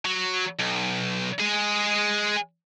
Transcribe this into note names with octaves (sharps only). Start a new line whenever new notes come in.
F#3
B1
G#3 G#4